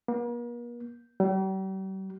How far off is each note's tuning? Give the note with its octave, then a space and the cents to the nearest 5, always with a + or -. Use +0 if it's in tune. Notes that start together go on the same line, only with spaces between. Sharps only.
A#3 +45
G3 -45